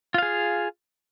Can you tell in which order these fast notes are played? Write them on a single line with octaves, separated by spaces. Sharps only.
F4 F5 G#4